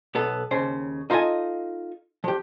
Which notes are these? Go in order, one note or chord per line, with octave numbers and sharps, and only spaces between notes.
B1 B3 A4
D#2 C#3 C5
D#4 F4 A4 D#5 G#5
F3 G4